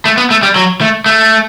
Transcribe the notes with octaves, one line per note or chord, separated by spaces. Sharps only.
A3
B3
A3
G3
F#3
A3
A3